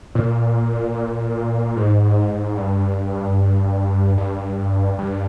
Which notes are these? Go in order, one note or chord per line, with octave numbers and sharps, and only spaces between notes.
A#2
G#2
G2
G2
G2